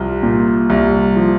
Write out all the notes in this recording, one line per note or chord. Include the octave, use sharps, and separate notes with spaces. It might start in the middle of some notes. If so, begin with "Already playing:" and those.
Already playing: C2 F3
A#2
C2
F3